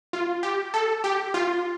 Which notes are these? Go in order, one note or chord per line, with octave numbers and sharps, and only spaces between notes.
F4
G4
A4
G4
F4